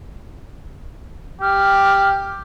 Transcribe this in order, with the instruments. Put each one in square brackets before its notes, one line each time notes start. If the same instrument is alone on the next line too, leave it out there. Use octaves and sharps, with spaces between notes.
[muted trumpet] G4 [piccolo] F6